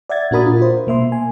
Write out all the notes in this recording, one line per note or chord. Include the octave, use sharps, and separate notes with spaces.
D5 E5 F#5 G#6 A6
A#2 D4 F#4 A#4 B5 D#6
F4
C5
B2 A#3 E5 C6
G#5